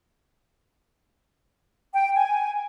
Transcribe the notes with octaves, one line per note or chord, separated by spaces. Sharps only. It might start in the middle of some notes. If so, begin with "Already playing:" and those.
G5
G#5